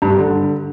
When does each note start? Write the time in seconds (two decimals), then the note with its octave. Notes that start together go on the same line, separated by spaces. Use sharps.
0.02 G2
0.10 G3
0.18 D3